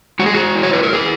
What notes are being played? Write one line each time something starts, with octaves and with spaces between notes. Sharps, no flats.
G#3 F#4
G#4
F#4
E4
C#5
B4
A#4
E4 G#4